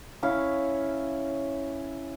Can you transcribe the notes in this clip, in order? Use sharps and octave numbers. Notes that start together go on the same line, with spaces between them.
C#4 E4 F5